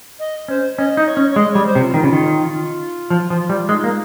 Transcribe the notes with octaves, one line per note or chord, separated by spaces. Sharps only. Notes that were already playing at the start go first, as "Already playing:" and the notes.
D#5
C#4 C5
C#4 D#5
D#4
C#5
C#4
C#5
G#3 D#5
C#5
G3
C5
C3
F4
D#3 F4
C#3
D#3
F4
F3
F3
G3
G#3 D#4
A#3